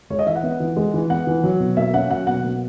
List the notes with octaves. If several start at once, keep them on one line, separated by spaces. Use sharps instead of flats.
G#3 C#5
D#5
E3 E5
F#5
B3
E3
G#3
E3
B3 F#5
E3
F#3
B2
A#3 E5
C#4 F#5
F#3 F#5
B2 F#5
A#3